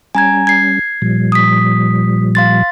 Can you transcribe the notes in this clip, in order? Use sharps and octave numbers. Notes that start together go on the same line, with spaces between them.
G3 C#4 G#5 A#5 G#6
G#6 C7
A#2 F3 G3
D#6 B6
F5 C6 A6